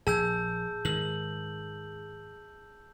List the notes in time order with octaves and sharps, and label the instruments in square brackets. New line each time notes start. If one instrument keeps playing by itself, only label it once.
[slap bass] A#1 [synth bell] G#4 [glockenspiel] A5 E6 G6
[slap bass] G#2 D#3 [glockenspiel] F#7